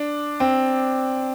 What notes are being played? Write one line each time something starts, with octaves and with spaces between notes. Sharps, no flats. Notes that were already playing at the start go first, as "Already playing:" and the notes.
Already playing: D4
C4